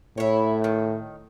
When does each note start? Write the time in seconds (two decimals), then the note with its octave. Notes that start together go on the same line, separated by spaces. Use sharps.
0.18 A2 E4 C#5
0.64 D#3